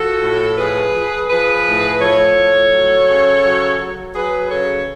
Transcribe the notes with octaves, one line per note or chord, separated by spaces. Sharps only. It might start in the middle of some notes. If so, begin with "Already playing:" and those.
Already playing: F3 F#4 A4
A2
F3 G#4 B4
F3
F3 G#4 B4
A2
F3 A4 C#5
A2
F#3
C#3
F#3
F#3
F#3 G#4 B4
C#3 A4 C#5